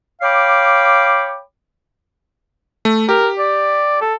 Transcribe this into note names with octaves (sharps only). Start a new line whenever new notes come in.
C#5 F5 G5 B5 D6
A3
G4 A#4
D5
A4